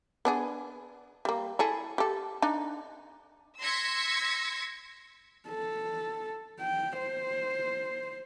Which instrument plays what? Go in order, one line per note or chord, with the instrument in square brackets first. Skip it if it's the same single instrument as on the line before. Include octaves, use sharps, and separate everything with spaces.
[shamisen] B3 D4 G#4
G3 A#3
E4 G#4 A4
G4 A4
D4 D#4
[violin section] C6 E6 G#6 A#6 B6 C#7
[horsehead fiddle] A4
G5
C5